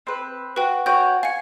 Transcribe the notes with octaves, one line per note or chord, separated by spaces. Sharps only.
C4 B4
F#4 B4 G5
F#4 C#5 G5 G#5 G6
F5 G#5 C#7